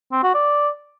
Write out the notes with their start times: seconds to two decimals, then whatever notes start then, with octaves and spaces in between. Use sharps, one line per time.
0.12 C4
0.23 F#4
0.35 D5